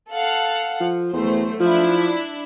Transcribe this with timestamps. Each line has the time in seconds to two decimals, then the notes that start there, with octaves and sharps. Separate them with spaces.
0.12 A4 F5 F#5
0.80 F3
1.13 E2 F#3 A3 C5
1.60 F3 D4 E4